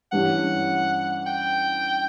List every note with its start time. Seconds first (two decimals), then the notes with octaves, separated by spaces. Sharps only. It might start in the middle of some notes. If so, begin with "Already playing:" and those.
0.12 G2 E3 G3 C#4 F#5
1.26 G5